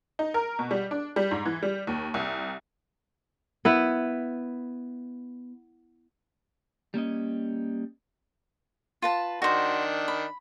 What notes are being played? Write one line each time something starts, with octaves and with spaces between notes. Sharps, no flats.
D#4
A#4
B2
G3
D4
G3
G#2
E3
G3
D#2
C2
B3 E4 B4
G3 A#3 C#4 D#5
F4 B4 A5
D#3 D4 F#4 C5
B5